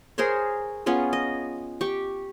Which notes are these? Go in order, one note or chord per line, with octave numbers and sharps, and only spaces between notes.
G#4 A#4 C5 C#5
B3 C#4 F4 G#4
D#5
G4 C#6